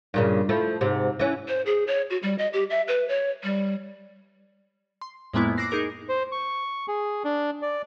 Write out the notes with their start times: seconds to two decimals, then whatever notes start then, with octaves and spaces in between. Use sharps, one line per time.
0.14 G2 A#2 C#3
0.49 F3 A3 E4
0.81 G#2 C3
1.19 E3 C#4
1.48 C5
1.66 G#4
1.87 C#5
2.10 F#4
2.23 G3
2.38 D#5
2.53 G4
2.70 E5
2.88 B4
3.08 C#5
3.43 G3
5.02 C6
5.34 F2 A2 G#3 A#3 B3 E4
5.57 D6 E6 F#6 A#6 C7
5.70 D#4 G#4 A#4 D6 A#6
6.09 C5
6.32 C#6
6.88 G#4
7.24 D4
7.62 D5